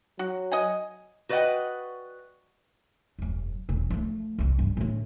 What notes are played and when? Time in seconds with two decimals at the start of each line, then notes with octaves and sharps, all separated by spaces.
0.19 F#3 F#4
0.52 D#5 F#5 G#5
1.29 F#4 B4 D5 D#5 F#5 G5
3.19 E1 F#2
3.69 E1 D3
3.90 F3 A3
4.39 C2 F2
4.58 C#2 G2
4.77 A2 D3